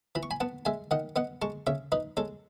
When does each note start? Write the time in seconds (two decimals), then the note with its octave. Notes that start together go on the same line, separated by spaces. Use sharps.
0.15 E3 B5
0.23 C#6
0.31 G#5 B5
0.40 B3 F#5 A5
0.65 G#3 E5 G#5
0.91 D#3 D#5 F#5
1.16 B3 D#5 F#5
1.42 G#3 A5 C#6
1.67 C#3 C#5 E5
1.92 D#4 B4 D#5
2.17 G#3 A4 C#5